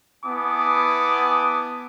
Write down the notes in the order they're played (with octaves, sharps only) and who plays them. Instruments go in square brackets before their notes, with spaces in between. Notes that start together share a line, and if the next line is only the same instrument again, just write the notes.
[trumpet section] B3 E4 G#5 A5 D6 D#6